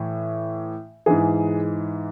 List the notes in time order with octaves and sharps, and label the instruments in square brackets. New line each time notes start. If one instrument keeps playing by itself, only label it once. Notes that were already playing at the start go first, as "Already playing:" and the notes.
Already playing: [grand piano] A2 E3
G#2 E3 G#4